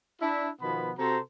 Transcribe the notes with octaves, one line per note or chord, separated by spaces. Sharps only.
D4 E4
B2 D#3 F3 B3 B5
C3 F#4 A4 C5 A#5